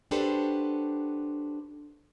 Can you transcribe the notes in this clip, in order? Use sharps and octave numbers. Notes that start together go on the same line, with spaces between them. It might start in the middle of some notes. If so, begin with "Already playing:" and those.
D4 F#4 G4 A4 B4 C5